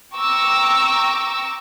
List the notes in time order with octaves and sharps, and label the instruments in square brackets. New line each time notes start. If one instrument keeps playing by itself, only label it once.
[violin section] G5 A#5 C#6 D6 E6